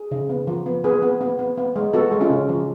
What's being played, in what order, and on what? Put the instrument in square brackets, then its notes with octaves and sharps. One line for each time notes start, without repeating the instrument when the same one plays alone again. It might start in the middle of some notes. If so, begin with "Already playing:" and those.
Already playing: [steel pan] G#4
C#3
B3
F3
B3
B3 G#4 B4
B3
B3
B3
B3
G#3
B3 F#4 A4
G#3
C#4 F4
C#3
F3